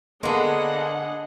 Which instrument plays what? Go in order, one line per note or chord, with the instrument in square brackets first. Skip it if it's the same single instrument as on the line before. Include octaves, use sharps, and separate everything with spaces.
[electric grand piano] D3 A#3 [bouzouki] G#3 B3 [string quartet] D4 G#4 F#5 [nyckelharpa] D#5